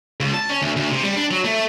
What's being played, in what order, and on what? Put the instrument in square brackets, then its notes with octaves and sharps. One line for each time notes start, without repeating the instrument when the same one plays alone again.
[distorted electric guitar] C#2
A5
C#4
D2
D2
C3
G3
D4
F#3
A3